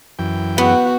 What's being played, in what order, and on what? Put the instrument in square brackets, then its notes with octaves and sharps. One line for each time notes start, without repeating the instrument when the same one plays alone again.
[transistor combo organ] F#2 E3 G5
[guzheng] B3 [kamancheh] F#4